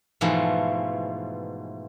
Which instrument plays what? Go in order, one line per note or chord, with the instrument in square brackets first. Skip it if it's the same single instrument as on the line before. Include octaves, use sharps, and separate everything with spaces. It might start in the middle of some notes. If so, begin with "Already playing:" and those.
[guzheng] G#2 B2 E3 F3 A3